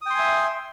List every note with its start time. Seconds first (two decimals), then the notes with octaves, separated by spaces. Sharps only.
0.01 D#6
0.06 G5
0.10 C6
0.15 G#5
0.19 E5